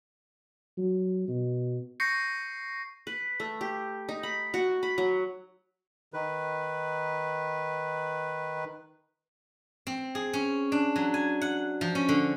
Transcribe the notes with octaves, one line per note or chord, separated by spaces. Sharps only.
F#3
B2
C#6 G6 A#6 C7 C#7
B4
A3
G4
D#4
B5
F#4
B5
F#3
D#3 B4
C4
G#4
C#4
D4
F#3
G#5
F#5
F3
C#4
D3